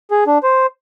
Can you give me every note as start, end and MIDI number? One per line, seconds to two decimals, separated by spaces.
0.11 0.24 68
0.27 0.38 62
0.43 0.66 72